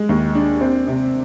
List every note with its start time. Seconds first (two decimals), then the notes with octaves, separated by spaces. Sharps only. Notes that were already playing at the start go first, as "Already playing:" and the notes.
Already playing: G#3
0.09 D#2
0.35 D4
0.61 C4
0.87 C3